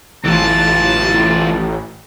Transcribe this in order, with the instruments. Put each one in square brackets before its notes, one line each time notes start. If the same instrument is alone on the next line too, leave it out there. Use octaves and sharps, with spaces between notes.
[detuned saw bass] A1 [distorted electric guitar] E3 F4 [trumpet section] A5